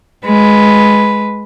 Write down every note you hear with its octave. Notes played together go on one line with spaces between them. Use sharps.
G#3 B4